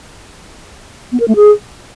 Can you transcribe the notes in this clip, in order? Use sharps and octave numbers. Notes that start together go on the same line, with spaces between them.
B3
A#4
A3
G#4